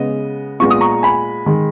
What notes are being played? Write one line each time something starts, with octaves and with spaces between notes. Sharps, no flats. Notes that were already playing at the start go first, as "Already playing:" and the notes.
Already playing: C#3 G#3 B3 D#5
A#2 G#3 B3 C#6
D#6
A#5 C#6
G#5 B5
D#3 G#3